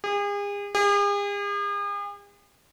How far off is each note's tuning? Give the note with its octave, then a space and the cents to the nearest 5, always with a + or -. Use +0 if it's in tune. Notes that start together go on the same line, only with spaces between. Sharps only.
G#4 -40
G#4 -45